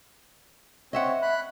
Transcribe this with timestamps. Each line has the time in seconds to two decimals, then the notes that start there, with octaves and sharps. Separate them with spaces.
0.93 C4 C#5 D#5 E5 F#5
1.22 B5 F#6